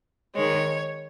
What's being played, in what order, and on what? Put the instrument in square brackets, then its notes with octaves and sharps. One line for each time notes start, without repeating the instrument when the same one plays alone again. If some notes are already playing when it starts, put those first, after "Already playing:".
[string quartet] D#3 G#3 C#5